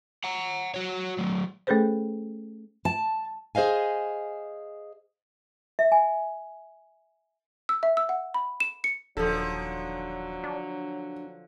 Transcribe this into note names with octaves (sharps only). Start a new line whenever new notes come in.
F#5 A#5
F#4 C#5
F#3 A3
A3 C#4 G#4 A4 B4 C5
A5
G#4 C5 D#5 F5 G#5
E5
G#5
E6
E5
E6
F#5
B5
E7
C#7
D#1 D3 F3 F#3 A4
D4